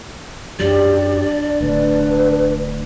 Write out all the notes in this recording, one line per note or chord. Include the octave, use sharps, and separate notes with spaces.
F#2 F#3 D4 G4 D5
D1 D2 B4